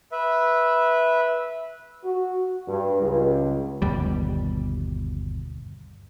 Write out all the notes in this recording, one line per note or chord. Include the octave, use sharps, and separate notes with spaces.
B4 E5
F#4
G2
C#2
G1 D#2 B2 G3